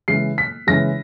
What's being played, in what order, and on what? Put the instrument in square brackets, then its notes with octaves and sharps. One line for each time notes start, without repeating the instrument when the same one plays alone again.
[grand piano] C#3 E3 G#3 C7
B6
C#3 E3 G#3 A#6